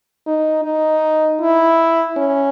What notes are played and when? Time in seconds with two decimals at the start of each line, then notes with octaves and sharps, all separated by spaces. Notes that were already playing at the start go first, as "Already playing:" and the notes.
0.27 D#4
0.65 D#4
1.41 E4
2.17 C#4